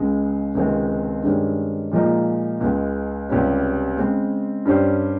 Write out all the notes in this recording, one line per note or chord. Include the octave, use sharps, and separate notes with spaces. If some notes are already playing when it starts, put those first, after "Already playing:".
Already playing: C#2 C#3 G#3
C#2 C3 D#3 G#3 C4
G2 D#3 G#3 C#4 G4
A#2 F3 G#3 D#4 A#4
C#2 C#3 G#3
C#2 C3 G3 C#4 G4
C#3 G#3 C4
G2 G3 C#4 G4 C5